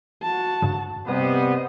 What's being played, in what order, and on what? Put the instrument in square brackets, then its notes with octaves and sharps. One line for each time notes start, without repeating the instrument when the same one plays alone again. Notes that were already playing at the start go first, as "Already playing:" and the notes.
[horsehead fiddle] F#4 A5
[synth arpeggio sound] G2 C#3
[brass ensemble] C3 G3 B3 [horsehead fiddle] C5 D#5